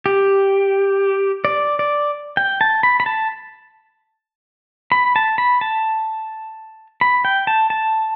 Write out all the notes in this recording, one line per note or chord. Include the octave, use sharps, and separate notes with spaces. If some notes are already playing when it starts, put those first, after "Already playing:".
G4
D5
D5
G5
A5
B5
B5
A5
B5
A5
B5
A5
B5
G5
A5
A5